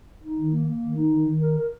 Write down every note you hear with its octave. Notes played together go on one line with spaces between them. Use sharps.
D#4
D#3
A#3
A#3
D#3
D#4
D#3
D#3
A#4
A#4